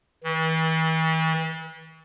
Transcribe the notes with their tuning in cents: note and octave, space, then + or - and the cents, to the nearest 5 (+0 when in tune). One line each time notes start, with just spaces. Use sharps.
E3 -40